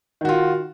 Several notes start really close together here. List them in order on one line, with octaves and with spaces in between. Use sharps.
D#3 F#4 F4